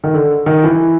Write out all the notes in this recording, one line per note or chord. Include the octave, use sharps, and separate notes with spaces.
D#3
D3
D#3
E3